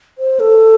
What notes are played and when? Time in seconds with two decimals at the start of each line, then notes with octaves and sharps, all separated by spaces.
0.18 C5
0.40 A4